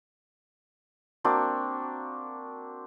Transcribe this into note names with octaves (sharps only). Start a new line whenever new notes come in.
A#3 C4 D4 F#4